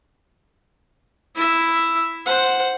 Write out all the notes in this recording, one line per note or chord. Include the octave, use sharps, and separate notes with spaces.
E4 E5
C5 F#5